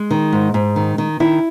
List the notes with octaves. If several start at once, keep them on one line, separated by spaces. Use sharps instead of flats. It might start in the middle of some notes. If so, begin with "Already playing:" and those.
Already playing: G#3
D#3
G#2
G#2
D#3
D#3
D#3 E4